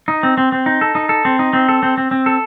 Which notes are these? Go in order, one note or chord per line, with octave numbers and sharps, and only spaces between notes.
D#4
C4
C4
C4
D#4
A4
D#4
A4
C4
D#4
C4
A4
C4
C4
C4
A4